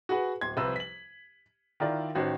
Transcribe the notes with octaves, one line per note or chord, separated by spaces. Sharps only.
F#4 G#4 B4 F#5
D1 C6 G#6
C2 F3 B4 C5 E6
B6 F#7
D#3 E4 F4 A#4 D5
A1 D#3 F#4 C5